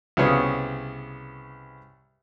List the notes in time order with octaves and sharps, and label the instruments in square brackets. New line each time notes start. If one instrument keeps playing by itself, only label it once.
[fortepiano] C2 C#3 B3 C#5 F5 D#6